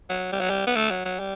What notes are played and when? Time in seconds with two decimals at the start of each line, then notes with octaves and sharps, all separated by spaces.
0.09 F#3
0.32 G3
0.40 F#3
0.50 G3
0.67 B3
0.76 A3
0.90 F#3
1.05 F#3
1.20 G3